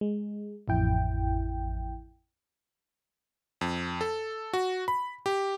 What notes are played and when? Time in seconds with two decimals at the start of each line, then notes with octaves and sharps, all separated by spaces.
0.01 G#3
0.68 A1 F2 E4 G5
3.61 F2
4.01 A4
4.53 F#4
4.88 B5
5.26 G4